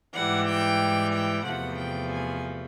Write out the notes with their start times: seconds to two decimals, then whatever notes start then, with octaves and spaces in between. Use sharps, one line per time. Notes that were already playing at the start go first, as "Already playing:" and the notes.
0.13 G#2 E3 G3 F#5
0.46 G5
1.13 G5
1.45 E2 C3 F3 A3 F#5
1.78 G5
2.11 G#5